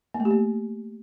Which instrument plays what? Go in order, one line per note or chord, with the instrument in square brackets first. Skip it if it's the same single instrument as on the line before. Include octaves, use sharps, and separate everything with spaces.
[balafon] A#3
A3
G4
A#3